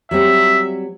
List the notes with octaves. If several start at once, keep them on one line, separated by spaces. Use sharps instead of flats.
F#3 G3 C4 E5